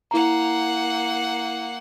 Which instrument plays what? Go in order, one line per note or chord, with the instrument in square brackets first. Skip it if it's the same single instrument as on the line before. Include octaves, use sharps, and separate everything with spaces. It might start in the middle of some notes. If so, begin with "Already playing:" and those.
[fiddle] A#3 F#5 [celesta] E4 A#5